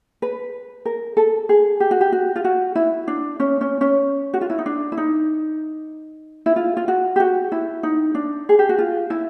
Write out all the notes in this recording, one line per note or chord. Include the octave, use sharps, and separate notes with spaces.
B4
A#4
A4
G#4
G4
F#4
G4
F#4
F4
F#4
E4
D4
C#4
C#4
C#4
F#4
F4
E4
D#4
D4
E4
D#4
E4
F4
F4
F#4
G4
F#4
E4
D#4
D4
G#4
G4
F#4
F4
E4